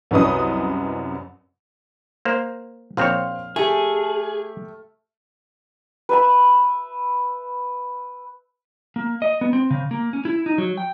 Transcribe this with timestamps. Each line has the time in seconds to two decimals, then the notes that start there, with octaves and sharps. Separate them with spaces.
0.11 C2 F#2 C#4 B4 D#5 D#6
2.25 A#3 C5
2.97 A#1 C4 C#5 F5 C6 F6
3.56 A3 G4 G#4
6.09 B4 E5 B5
8.96 A#3
9.22 D#5
9.41 B3
9.53 C4
9.71 C#3
9.91 A#3
10.13 C#4
10.25 E4
10.46 D#4
10.58 F#3
10.78 G5